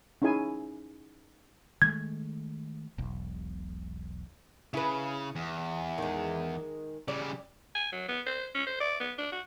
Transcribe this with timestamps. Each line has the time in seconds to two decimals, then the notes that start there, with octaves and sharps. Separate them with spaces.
0.22 C#4 D#4 E4 G#4 G#5
1.82 D#3 G#3 A3 G#6
2.98 E1 B1
4.74 C#3 E4 B4
5.36 E2
5.98 D#3 G#3
7.08 C#3 G3 D5
7.75 G#5
7.92 F#3
8.08 B3
8.26 C5
8.55 C#4
8.66 C5
8.80 D5
9.00 B3
9.18 D4
9.32 F#4